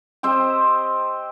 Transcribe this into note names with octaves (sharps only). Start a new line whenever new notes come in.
C4 G4 C5 D#5